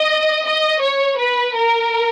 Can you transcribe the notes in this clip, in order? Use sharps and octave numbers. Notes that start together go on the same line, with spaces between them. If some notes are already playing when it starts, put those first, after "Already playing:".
Already playing: D#5
D#5
C#5
B4
A#4